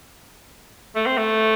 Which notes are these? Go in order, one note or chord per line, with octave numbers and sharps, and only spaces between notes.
A3
C4
A3